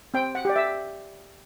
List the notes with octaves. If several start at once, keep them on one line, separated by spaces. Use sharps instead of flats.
C4 G5
F#5
G4 D5
E5